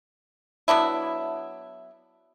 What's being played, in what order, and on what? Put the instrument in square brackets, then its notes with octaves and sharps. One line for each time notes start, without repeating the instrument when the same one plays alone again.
[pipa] F#3 B3 D4 E4